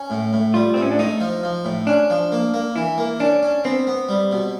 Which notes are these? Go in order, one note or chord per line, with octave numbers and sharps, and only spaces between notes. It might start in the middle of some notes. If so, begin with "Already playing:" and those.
Already playing: C#4
A2
A2
G3 F4
A2 C4
C#4
D4
A3 D#4
F3
F3
A2
C#4 D4
F3
A#3
A#3
E3 E4
A#3
C#4 D4
C#4
B3 C4
B3
G3
B2